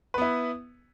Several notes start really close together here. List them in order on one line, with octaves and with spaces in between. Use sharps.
B4 B3 E4